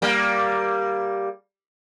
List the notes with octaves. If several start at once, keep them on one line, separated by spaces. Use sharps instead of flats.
G3 A#3